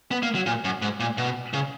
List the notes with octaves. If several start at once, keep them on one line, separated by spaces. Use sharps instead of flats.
B3
A#3
F#3
A#2
F#2
G#2
A#2
B2
C#3